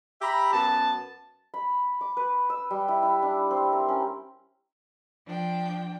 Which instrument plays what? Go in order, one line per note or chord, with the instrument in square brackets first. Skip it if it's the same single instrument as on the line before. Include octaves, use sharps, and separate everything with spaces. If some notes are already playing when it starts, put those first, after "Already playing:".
[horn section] G4 E5 A#5 B5
F#2 B3 A5
[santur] B5
D6
B4
E6
G3
E4
E4
D4
C4
A#4
C#4
[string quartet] F3 D4 G5